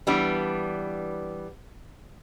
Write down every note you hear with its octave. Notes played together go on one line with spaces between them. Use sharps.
E3 G3 B3 D4